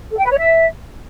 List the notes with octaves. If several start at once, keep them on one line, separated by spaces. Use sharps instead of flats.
A4
G5
B4
C#5
E5